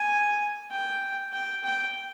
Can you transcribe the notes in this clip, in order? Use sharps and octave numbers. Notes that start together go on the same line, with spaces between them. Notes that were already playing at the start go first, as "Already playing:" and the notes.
Already playing: G#5
G5
G5
G5